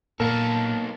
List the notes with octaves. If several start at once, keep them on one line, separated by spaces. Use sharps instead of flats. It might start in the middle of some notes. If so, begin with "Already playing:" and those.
B1 A#2 A#3 A4 A#4 A5